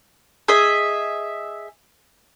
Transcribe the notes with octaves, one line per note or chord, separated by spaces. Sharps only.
G#4 D#5 E5